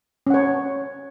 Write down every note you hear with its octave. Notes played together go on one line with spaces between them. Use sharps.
C#4 C#5 F#5